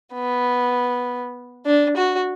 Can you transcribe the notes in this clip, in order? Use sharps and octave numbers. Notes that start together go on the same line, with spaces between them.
B3
D4
F#4